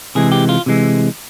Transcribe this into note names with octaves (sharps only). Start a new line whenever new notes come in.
C3 E3 G#3 G#4
G4
F4
C3 E3 G#3